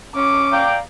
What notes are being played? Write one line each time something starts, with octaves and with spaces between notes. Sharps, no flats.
C#4 D6
D5 F5 G5 A#5